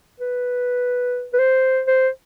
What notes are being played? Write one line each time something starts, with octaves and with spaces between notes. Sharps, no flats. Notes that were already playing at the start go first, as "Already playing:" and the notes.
B4
B4
C5
C5